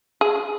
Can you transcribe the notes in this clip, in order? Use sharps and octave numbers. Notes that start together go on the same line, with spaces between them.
G#4